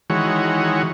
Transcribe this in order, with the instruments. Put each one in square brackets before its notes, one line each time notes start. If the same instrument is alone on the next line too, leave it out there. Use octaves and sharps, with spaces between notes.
[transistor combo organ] D#3 E3 G#3 F#4 C#5